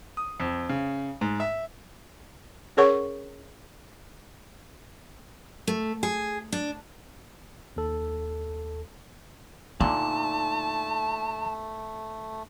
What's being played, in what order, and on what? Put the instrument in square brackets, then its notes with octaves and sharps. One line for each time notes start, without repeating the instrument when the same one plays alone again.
[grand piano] D#6
F2
C#3
G#2
E5
[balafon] C#4 G#4 A#4 C#5 F#5 C#6
[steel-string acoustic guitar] A3
G#4
D4
[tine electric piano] D#2 A4
[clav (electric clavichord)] A#2 D3 [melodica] A3 [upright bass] D#4 [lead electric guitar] A5